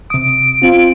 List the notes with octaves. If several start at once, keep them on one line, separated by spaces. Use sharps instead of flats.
C3 D#6 D7
C4 F4